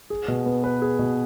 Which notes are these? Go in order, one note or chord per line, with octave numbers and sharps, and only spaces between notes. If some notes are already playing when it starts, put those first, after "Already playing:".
G#4
B2
B3
B4
G#4
B2